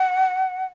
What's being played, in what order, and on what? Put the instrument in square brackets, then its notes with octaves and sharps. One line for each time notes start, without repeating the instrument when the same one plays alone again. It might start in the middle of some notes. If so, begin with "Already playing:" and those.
Already playing: [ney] F#5